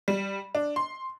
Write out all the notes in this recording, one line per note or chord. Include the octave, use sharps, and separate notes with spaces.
G3
D4
C6